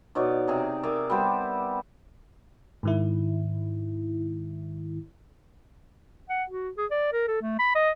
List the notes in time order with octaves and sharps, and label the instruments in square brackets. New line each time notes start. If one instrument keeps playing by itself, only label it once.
[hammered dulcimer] B2 D#4 C#5 D5
C3 G#4 A#5
G#4 A#4 D5 E5
G3 B3 G4 C5
[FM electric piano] G#2 D#3 E4
[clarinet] F#5
F#4
G#4
D5
A#4
A4
A3
B5
D#5